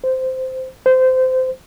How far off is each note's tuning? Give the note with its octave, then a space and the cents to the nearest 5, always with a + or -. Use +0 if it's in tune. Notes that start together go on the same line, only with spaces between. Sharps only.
C5 -10
C5 -20